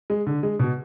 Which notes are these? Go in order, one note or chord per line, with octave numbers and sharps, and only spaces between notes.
G#3
D3
G#3
B2